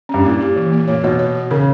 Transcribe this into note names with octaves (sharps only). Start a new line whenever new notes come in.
G2 C#4
A#2 E4
G4
E3
A#3
A#2 C#5
B2 C#5
C#5
F#4
C#3 A#4